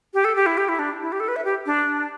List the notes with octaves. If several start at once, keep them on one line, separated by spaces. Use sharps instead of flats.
G4
A4
G4
E4
G4
E4
D4
E4
G4
A4
B4
E5
G4
D4